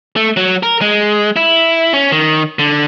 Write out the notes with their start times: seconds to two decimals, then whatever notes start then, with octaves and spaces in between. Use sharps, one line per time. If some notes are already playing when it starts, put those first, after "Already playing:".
0.16 A3
0.37 F#3
0.63 A#4
0.81 G#3
1.36 E4
1.93 C#4
2.12 D#3
2.59 D3